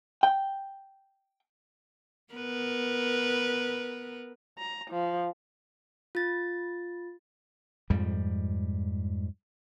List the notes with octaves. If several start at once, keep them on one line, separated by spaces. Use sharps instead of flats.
G5
B3 A#4 B4
A#5
F3
F4 A6
F2 G#2 F3 G3